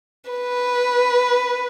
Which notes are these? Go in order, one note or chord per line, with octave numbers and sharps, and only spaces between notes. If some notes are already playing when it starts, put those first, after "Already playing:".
B4